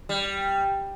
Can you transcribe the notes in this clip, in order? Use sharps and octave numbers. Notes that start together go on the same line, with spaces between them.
G3